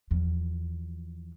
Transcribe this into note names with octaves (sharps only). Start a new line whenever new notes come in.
E2 F3